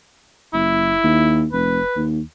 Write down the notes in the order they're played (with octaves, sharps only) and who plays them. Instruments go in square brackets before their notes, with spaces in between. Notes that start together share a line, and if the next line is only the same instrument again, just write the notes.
[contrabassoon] F#1 [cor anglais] E4
[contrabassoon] D#2
[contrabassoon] F1 [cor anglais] B4
[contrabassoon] D#2